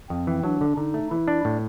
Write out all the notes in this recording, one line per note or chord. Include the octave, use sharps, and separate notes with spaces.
F2 C4
E3
F#3 D4
D3
D3 D#4
A3
E3 E4
D4
A2